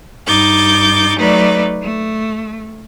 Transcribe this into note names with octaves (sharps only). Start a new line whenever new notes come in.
G2 D#4 D6 G6 A6
F#3 A3 D#4 B4 D5
A3